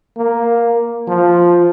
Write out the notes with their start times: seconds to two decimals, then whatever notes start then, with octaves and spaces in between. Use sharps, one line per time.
0.17 A#3
1.08 F3